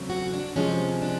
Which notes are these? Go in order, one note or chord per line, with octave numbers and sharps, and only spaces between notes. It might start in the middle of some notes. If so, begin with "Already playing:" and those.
Already playing: E2 C#3 F#3 A3 C4
F#4
D4
C3 F3 G#3 C4 C#4
D4